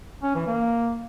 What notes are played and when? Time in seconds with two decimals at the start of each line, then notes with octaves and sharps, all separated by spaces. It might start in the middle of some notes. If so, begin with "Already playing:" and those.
0.23 C#4
0.35 E3
0.47 A#3